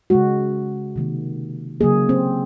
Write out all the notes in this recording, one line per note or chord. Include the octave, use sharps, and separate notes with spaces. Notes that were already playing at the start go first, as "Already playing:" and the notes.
C#3 G#3 F#4
C3 D#3 A#3
C#3 F#3 A#3 G#4
C4